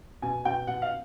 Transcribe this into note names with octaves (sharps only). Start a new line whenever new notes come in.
B2 G#5
B2 G5
B2 F#5
F5